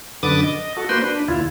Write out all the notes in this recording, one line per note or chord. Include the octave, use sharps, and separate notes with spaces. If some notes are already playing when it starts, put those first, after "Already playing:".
F#2 D3 B4 D6 D#6 A6
D#5
F#4 A4
A#3 F#4 B4 C5 G5 C6
D4 B4
D#2 E4 F4